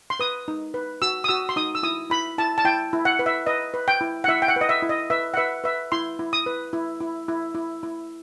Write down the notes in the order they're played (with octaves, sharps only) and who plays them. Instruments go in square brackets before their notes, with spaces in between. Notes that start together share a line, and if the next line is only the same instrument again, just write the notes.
[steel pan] C6
B4 D#6
D#4
B4
F#4 E6
D#6
F#4 E6
C6
D#4 D#6
E6
E4 D#6
E4 B5
E4 A5
A5
E4 G5
E4
F#5
B4
E5
B4 D#5
B4
G5
E4
F#5
E4 E5
G5
F#5
B4 D#5
E5
E4
D#5
B4 E5
F#5
B4 E5
B4 E5
E4 C6
E4
D#6
B4
E4
E4
E4
E4
E4